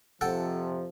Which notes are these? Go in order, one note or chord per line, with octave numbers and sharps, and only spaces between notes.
F2 C3 F3 A4 F#5 G5